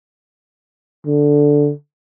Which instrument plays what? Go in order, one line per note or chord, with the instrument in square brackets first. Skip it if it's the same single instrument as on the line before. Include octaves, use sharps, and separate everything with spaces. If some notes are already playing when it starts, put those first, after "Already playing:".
[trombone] D3